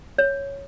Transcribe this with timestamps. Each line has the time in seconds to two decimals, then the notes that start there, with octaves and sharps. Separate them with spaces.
0.18 C#5